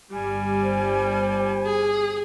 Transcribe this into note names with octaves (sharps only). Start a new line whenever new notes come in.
G1 G3 G#5
C5
G#4